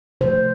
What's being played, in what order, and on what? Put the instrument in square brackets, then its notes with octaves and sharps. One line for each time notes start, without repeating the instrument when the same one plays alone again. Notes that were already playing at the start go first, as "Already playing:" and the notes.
[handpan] C3 F3 A3 C5